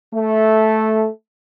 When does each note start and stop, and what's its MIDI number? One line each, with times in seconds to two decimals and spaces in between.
0.13 1.07 57